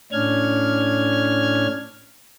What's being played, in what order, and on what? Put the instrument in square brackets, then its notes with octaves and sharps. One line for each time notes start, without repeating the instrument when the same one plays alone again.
[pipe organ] A2 C#4 D4 F6 G#6